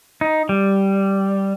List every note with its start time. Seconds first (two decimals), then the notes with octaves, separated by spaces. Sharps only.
0.21 D#4
0.49 G3